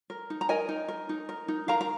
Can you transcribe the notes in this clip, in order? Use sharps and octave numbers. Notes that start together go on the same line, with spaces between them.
A#4
D#4
A#5
A#4 D#5 G#5
D#4
A#4
D#4
A#4
D#4
A#4 F5 A#5
A#5